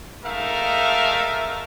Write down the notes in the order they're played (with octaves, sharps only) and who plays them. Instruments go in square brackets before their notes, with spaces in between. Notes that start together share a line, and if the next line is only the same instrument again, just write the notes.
[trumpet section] G#3 A3 D#4 A#4 E5 F5